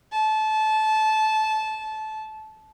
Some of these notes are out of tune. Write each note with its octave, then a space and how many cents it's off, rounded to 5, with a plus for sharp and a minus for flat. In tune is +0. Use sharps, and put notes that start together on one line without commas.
A5 -20